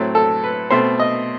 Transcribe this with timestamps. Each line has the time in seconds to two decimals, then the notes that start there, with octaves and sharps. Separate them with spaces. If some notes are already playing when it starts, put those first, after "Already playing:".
Already playing: A2 F#3 A3 C4
0.15 A4
0.44 B4
0.70 B2 A3 C4 C5
1.00 D#5